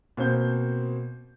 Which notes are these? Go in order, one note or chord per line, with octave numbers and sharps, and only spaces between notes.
B2 A#3 C4 C5 G6